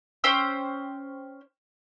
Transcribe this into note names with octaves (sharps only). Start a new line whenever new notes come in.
C#4 C5 G5 E6